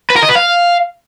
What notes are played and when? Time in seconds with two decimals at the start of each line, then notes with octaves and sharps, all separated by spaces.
0.10 B4
0.16 A#4
0.23 D#5
0.29 B4
0.35 F5